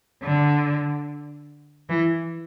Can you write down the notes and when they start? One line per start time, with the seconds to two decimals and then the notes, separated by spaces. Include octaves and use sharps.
0.23 D3
1.89 E3